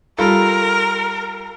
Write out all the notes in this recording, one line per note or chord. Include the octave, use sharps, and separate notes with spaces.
G3 F4 A4 A#4